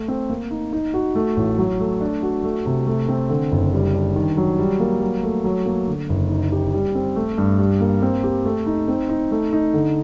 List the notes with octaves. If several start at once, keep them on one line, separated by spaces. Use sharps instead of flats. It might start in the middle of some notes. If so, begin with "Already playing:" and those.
Already playing: A3
C4
A#3
D#4
D#4
F#4
A3
A1
F#3
A3
D4
F#4
A3
C3
A3
C4
D3
F#1
G3
D4
D#3
F#3
G3
A#3
F#3
A3
F#3
A#3
D3
F#1
D#4
G4
G3
C4
A3
G2
G3
A#3
C4
G4
A3
D#4
C4
D#4
A3
D#4
D3